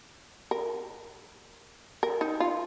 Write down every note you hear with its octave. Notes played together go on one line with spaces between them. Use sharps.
A#4
A#4
D#4
F4